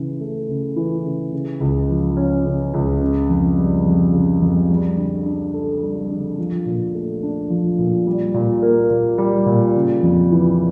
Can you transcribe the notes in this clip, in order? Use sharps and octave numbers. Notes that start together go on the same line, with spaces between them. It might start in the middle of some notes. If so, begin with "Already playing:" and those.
Already playing: C#3 E3
A3
C#3
E3
C#3
C#3
C#2
F3
C#4
C#3
C#2
C#3
F2
G3
F2
C#3
F2
G3
D3
D4
A4
G3
D3
F3
A#2
A3
D4
F3
A#2
G3
A#2
A#3
A#2
G3
A#2
C#3
F2
E3